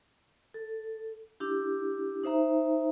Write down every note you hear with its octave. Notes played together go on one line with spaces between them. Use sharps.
A4
D4 E4 G4
D#4 C5 E5 A#5